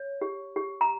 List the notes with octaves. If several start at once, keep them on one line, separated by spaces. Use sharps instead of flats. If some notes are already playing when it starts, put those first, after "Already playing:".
Already playing: C#5
G4
G4
A#5